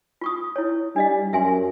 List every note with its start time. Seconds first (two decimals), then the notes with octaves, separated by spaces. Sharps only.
0.21 F4 C#6 D#6
0.56 E4 C#5
0.96 G3 D4 D#5 F5
1.33 F#2 E5 G#5 C6